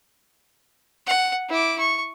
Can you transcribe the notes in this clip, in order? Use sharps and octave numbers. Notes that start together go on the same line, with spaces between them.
F#5
E4 D6
C#6